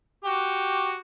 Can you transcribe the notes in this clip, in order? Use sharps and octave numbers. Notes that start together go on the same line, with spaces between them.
F#4 G4